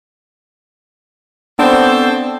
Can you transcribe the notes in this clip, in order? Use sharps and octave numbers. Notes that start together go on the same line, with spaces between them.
B3 C4 D4 A4 C5